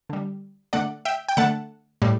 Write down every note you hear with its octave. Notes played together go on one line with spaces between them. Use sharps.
D3 G3
D3 A3 D5 F#5
E5 G5
G5
D3 A3 F#5 A5
A2 G3